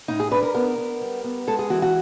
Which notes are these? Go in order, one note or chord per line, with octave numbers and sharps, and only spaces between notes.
A2 D#4
G#4
D4 B4
A#4
B3 A#4
B3
G3
B3
G#3 A4
G#4
E3 F#4
F#4